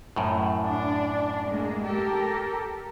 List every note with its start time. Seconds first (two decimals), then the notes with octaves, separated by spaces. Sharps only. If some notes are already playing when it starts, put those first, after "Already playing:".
0.16 F#2 A2
0.64 D4
1.49 G#3 A#3
1.86 G4 A4 A#4